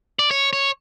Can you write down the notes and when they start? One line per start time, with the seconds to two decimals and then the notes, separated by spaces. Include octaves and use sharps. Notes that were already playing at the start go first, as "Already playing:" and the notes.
0.19 D5
0.31 C#5
0.53 C#5